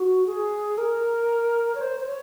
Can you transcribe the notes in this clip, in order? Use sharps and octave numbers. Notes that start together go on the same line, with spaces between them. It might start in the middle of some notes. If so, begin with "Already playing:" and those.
Already playing: F#4
G#4
A#4
C#5
C5
C5
C#5